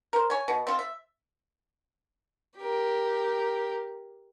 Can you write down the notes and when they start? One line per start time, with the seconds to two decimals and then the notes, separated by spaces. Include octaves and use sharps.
0.13 A#4 C5
0.30 C#5 G#5
0.48 B2
0.67 C4 F4
0.79 E5
2.58 G4 A#4